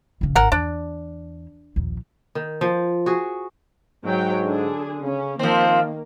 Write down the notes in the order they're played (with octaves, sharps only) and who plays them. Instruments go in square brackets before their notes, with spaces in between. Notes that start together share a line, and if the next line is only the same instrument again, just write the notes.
[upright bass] F1 C#3
[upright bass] G#1 [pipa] A#4 F#5
[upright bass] E2 [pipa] D4
[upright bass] A#1 D#2
[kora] D#3
F3
F#4 G#4
[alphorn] G#2 [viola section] F#3 C#5 G5
[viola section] D3 D4 G#4
[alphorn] C#3 [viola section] C#4
[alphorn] D#3 [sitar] F3 C4 [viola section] A#3